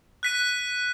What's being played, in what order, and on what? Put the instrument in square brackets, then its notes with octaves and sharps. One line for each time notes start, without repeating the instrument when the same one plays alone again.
[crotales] F#6 B6 D#7